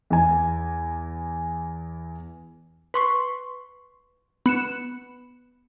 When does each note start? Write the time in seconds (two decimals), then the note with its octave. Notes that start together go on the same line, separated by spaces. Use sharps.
0.10 E2 G#5
2.94 B4 C6 C#6
4.46 B3 C#7 E7